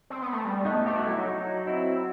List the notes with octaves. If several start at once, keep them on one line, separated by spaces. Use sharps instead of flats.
C4
B3
A3
G3
A3 B3 D#4
A3 G4
F#4
F#3 E4
D#4 F#4
C4 E4